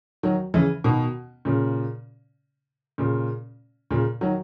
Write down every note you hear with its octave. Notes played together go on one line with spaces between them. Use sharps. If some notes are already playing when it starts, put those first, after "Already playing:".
D#3 F#3
C#3 E3
B2 D#3
A#2 C#3
A#2 C#3
A#2 C#3
D#3 F#3